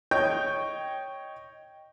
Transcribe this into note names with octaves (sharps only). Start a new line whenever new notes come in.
C#5 D#5 G5 C#6 G6